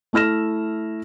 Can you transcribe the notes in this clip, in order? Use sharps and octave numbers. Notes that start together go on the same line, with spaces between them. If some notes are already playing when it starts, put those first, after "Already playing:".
A3 E4 F6 A#6 E7